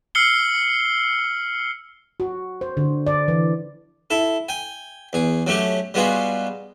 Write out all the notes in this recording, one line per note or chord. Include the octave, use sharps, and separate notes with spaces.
E6 F6 C7 C#7 G7
F#4
C5
D3
D5
E3
E4 A4
G5 G#5
E2 G#4
F#3 A3 C#4 G4
G3 G#3 B3 F4 F#4 G#4